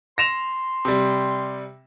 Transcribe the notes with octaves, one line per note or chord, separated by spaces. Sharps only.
C6 A#6 E7 F7
C3 G3